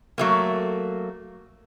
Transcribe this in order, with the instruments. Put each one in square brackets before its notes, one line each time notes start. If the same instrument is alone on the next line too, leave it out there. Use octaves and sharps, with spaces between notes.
[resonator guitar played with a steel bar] F#3 A3 A#3